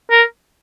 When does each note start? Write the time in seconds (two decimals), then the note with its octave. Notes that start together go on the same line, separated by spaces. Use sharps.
0.11 A#4